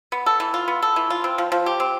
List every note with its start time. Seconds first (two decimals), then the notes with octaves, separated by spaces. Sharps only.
0.12 B3
0.26 A4
0.40 E3
0.54 F4
0.68 B3
0.82 A4
0.96 E3
1.10 F4
1.24 C4
1.38 F3
1.52 F3
1.66 G4
1.80 C4